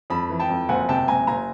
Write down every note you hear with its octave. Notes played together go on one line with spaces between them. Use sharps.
F2 A5 B5
E3
G5 A5
F2
F#1 F#5 G#5
C3 G5 A5
F#1 G#5 A#5
F#1 G#5 A#5